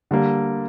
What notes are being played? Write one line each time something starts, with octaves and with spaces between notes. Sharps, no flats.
D3 G3 A#3